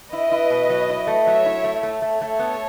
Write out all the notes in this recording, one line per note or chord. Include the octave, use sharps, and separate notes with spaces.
E4 B4 D#5
E4
B2
F#3
E4
A3
F#3 C#5 E5
E4
A3
A3
A3
A4 C#5
A3
B3